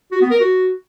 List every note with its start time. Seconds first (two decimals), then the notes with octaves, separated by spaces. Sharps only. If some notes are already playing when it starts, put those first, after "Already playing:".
0.12 F#4
0.21 B3
0.31 A#4
0.40 F#4